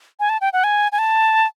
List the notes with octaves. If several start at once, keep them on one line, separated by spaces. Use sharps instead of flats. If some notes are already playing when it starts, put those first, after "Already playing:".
G#5
A5
G5
F#5
G#5
G#5
A5